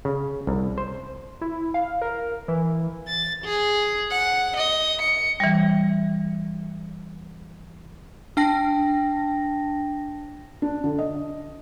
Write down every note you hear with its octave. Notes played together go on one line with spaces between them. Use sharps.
C#3
C2
C5
E4
F5
A#4
E3
A6
G#4
F#5
D#5
C#7
E3 G3
D4 G5 A5 A#6
D4
D3
D#5